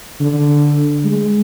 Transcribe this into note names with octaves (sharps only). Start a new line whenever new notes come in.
D3
G#3